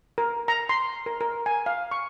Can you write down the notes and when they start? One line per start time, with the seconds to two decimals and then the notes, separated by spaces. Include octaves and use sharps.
0.18 A#4
0.48 A#5
0.69 C6
1.06 A#4
1.21 A#4
1.46 G#5
1.66 F5
1.91 C#6